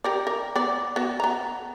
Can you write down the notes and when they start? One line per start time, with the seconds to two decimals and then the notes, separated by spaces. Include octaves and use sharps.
0.04 G4 A#4 D5
0.27 A#4
0.56 B3 D5
0.96 B3 F#4
1.20 B3 A#5